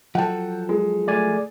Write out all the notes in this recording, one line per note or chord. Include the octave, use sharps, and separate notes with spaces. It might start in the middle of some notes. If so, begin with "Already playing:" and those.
F3 F#3 A4 F#5 G5 A5
G#3
A3 D5 G#5